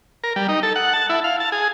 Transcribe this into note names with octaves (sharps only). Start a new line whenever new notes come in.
A#4
G3
D#4
A4
F#5
A5
E4
F5
A5
G#4